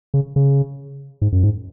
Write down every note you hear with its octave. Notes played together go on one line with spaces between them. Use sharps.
C#3
C#3
G#2
F#2
G#2